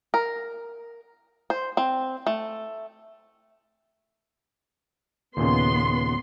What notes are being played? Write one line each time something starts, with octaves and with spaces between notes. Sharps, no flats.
A#4
C5
C4
A3
D#2 A#2 C#3 B3 C6